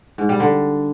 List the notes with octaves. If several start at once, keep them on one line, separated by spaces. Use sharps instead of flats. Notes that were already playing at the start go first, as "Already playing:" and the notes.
G#2
G3
D3